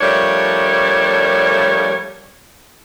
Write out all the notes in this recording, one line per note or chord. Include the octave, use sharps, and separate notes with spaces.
F3 G3 A3 D4 A#4 C#5